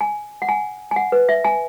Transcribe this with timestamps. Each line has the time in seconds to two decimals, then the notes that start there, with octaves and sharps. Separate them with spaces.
0.01 G#5
0.42 F#5
0.49 G#5
0.91 G#5
0.96 F#5
1.12 B4
1.29 E5
1.44 G#5